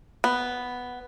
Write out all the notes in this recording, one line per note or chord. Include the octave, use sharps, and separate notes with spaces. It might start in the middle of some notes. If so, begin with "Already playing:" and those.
B3